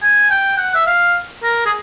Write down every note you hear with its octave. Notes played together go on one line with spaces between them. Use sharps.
G#5
G5
F#5
E5
F5
A#4
G#4